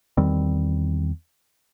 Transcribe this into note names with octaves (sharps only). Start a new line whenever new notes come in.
E2 D#3 G3 C4